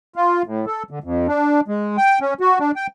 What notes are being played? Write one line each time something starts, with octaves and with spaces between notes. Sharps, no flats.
F4
A2
A4
D3
F2
D4
G#3
G5
C#4
F#4
D4
G5